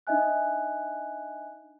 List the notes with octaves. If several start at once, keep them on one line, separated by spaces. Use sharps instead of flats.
D4 D#4 D#5 E5 G#5 F#6